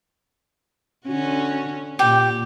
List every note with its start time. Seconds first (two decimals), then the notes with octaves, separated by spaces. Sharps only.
1.06 D3 C#4 F#4
1.99 A#2 G4